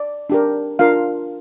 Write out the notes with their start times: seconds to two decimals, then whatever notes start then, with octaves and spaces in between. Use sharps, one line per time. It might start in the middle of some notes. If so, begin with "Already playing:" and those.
Already playing: D5
0.30 D4 G4 A#4
0.79 D4 F4 A#4 F5